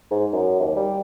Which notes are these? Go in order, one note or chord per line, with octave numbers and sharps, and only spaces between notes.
G#2
F#2
D#2
G3